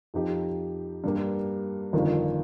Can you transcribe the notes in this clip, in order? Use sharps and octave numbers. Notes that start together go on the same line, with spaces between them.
F2 F3 D#4 G4
G2 G3 A#3 G4
G1 F2 D#3 A#3 F4